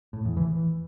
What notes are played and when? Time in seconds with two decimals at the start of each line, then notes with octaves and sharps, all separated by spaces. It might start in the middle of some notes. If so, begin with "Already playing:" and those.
0.13 A2
0.25 E2
0.37 E3